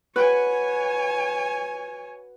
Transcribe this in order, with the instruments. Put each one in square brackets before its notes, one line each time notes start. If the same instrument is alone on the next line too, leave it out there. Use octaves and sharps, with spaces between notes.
[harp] F#4 B4 [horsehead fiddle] C#5 G#5